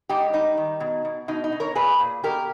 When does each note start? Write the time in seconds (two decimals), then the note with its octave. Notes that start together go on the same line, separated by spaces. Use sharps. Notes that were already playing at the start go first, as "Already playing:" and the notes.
0.09 G#2 D#4 G4
0.33 G3 D#4
0.57 D#3
0.80 B2
1.05 B2
1.28 B2 D#4
1.44 D#4
1.52 B2
1.60 A#4 C#5
1.75 A#2 G#4 B4
2.00 A#2
2.24 B2 G4 A#4